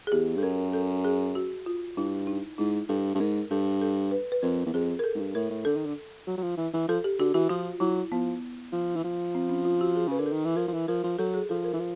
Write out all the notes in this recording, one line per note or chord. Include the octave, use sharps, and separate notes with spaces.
G#4
E2 G4
G2 A4
F#2 A#4
A4
G#4
F#4
F4
G2 E4
D#4
G#2 E4
G2 A4
G2
G#2 A#4
G2 A4
A4
B4
B4
F2 A#4
E2
F2 G#4
A#4
A4
G#2
G2
A2 A#4
A2
D3 A4
D#3
D3
F#3
F#3
F3
E3
E3
F3 A4
G4
D3 F#4
E3 F#4
F3 F4
F#3 E4
F3 B3
F3
E3
F3
C4
C#4
F4
F#4
G#4
C#3 B4
D3 A#4
A4
D#3
E3
F3 A#4
F3
E3
F3 A#4
F3
F#3 A4
G#4
F3 A4
A#4
E3
F3